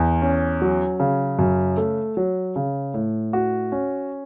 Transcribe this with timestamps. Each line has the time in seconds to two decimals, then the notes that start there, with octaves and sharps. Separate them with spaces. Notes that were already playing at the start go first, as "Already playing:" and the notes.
Already playing: E2
0.22 C#4
0.62 F#3
1.00 C#3
1.39 F#2
1.77 A3
2.17 F#3
2.56 C#3
2.94 A2
3.33 F#4
3.72 C#4